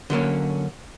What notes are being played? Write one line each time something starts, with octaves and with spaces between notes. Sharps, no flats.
D3 F#3 A#3 C#4